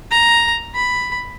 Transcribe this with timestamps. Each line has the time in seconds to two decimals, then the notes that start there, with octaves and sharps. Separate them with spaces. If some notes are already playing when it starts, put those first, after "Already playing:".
0.11 A#5
0.75 B5